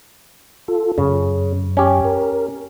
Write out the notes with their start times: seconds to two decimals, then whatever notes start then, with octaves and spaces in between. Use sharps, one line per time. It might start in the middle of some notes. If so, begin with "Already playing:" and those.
0.68 F4 A4
0.98 F#2 C#3
1.77 C#4 G4
2.04 A#4